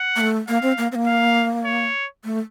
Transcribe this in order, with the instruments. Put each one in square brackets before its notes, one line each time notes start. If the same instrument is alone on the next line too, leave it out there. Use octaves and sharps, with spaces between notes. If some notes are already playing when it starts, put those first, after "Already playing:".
Already playing: [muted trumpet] F#5
[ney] A#3
A3
[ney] A#3 [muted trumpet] F5
[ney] C4
A#3
C4
A#3
[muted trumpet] F5
C#5
[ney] A3